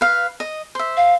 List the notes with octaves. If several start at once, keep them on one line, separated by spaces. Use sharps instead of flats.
B4 F5
D#5
C5 E5
F5